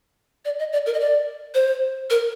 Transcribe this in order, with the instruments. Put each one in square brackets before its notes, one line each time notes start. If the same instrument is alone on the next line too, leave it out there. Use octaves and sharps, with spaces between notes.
[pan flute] D5
D#5
D5
A#4
D#5
D5
C5
A#4